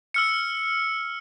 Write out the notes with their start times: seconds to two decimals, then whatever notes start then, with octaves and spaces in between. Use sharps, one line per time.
0.14 E6 F6 C#7